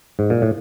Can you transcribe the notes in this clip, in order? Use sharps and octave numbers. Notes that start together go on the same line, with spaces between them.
G#2
A#2
A2